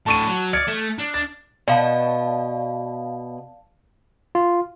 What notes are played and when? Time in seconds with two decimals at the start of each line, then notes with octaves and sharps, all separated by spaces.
0.06 A2 D3 A5 C#6 D#7
0.27 F#3
0.53 D5 F6 G#6 C#7
0.67 A3
0.99 D4
1.14 A6
1.68 B2 D5 F5 A5
4.35 F4